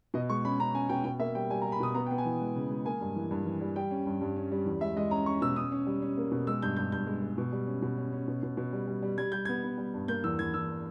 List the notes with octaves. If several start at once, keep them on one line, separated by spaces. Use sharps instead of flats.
B2 D#5
G#3 C#6
C#4 B5
C#4 A#5
C#4 G#5
B2 G5
B2 G5
A#3 E5
G3 G5
G3 G#5
A#5
G3
B5
B2 D#6
B3 A#5
G5
B3
G#5
E3
G#3
C#3
G#3
A#3 G#5
G2
E3
G2
E3
G3
G3 G5
C#4
G2
G2
C#4
G3
E2
G#3 E5
G#3 D#5
C#4 A#5
C#4 C#6
B2 E6
C#4 D#6
C#4
G3
C#4
A#3
B2
G#3 E6
G2 G6
G2 G6
G2 G6
G#3
G#3
B2
G3
C#4
B2
C#4
C#4
B2
B2
B2
G3
G3
G3
G3 G#6
G3 G6
B3 G#6
B3
G3
G2
A#3 G6
E2 E6
E2 G#6
E2 E6